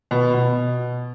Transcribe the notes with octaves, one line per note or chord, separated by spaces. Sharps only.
B2
B2